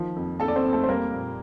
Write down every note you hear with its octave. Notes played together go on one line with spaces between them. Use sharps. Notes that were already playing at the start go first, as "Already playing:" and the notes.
Already playing: D#3 F3
F2
F2 A4 A5
D5
C4 C5
F2
A3 A4
C5
G3 A#3 A#4
A#2